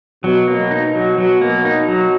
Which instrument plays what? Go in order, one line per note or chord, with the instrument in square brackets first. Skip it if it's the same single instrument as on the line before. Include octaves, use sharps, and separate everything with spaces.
[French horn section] B2 [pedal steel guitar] F#3
[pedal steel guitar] A#3
D#4
F#3
F#3
A#3
D#4
F#3